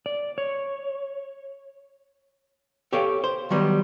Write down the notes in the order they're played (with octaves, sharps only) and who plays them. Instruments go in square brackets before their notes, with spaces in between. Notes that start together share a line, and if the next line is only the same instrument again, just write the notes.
[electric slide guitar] D5
C#5
[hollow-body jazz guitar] G4 A4 C#5 F5 G5
C5
D#3 F#3 G3 B3